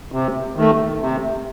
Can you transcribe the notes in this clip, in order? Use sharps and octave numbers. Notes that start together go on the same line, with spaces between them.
C3
D#3 A3
C3